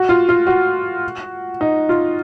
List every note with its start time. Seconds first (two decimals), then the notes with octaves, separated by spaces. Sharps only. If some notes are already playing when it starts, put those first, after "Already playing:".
Already playing: F#4
0.09 F4
0.29 F4
0.47 F#4
1.61 D#4
1.89 F4